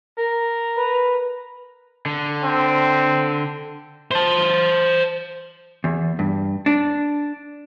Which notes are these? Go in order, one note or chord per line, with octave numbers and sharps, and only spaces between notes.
A#4
B4
D3
C4
C5 A5
E2
G2
D4